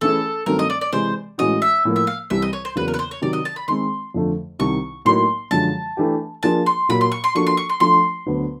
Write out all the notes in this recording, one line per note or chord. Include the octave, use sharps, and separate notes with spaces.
E3 A3 C#4 E4 G#4 A4
G2 D#3 F#3 A3 C4 A#4
D#5
D5
D5
C3 E3 G#3 C5
A2 E3 G#3 C#4 F#4 D#5
E5
A2 F3 A#3
E5
F5
C2 C3 E3 G3 E5
D#5
C#5
C5
E2 C#3 F#3 A#3 B4
A#4
B4
C5
C#5
C3 D#3 F#3 D5
D#5
A5
B5
D#3 G#3 C4 C6
F2 D3 F3 A3
C2 C3 D#3 C#6
A2 F#3 A#3 D#4 C6
F#2 D3 F3 G#3 A5
E3 A3 D4 G4
F3 A#3 D4 F4 G#4 A5
C6
A#2 F#3 A#3 B5
C6
C#6
C6
F3 A#3 D4 F#4 A4 C#6
C6
C#6
C6
F3 A3 D4 F4 C6
D2 D3 F#3 B3